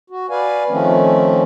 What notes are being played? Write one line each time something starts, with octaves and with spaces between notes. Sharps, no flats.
F#4
B4 D5 F5 G#5
D#3 F3 A3 C4 C#4